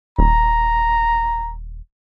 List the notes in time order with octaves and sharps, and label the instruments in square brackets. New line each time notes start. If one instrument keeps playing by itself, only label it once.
[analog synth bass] D#1 [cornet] A#5